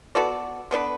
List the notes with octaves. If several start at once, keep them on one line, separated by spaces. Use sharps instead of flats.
B3 F#4 A4 D5
D3 B3 D4 B4